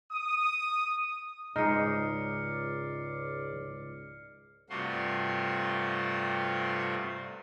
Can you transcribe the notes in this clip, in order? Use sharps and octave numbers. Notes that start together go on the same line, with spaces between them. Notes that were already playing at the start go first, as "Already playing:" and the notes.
D#6
C#2 G#2 G#3 D#4 D5 F6 C7 C#7
G2 C3 A3 F4 F#4 C6